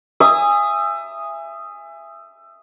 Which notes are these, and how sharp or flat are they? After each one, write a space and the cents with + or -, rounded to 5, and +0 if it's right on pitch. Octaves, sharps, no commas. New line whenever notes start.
E5 +25 G#5 -20 D#6 +0